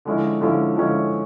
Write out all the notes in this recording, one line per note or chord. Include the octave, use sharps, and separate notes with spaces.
D3 F3 G#3 C#4 E4
D3 F3 G#3 C#4 E4
D3 F3 G#3 C#4 E4